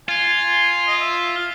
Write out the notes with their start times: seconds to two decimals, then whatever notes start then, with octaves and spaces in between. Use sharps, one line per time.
0.09 F4 G#5
0.87 D#5
1.01 E5
1.35 F5